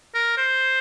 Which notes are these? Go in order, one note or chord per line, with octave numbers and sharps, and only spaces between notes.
A#4
C5